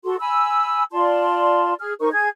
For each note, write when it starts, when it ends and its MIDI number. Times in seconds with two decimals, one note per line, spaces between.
0.04 0.16 66
0.04 0.16 69
0.04 0.16 84
0.20 0.83 80
0.20 0.83 83
0.20 0.83 88
0.91 1.73 65
0.91 1.73 74
0.91 1.73 81
0.91 1.73 84
1.79 1.93 68
1.79 1.93 89
2.00 2.09 63
2.00 2.09 70
2.00 2.09 72
2.00 2.09 85
2.13 2.28 68
2.13 2.28 80
2.13 2.28 92